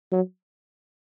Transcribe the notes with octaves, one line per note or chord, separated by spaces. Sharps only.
F#3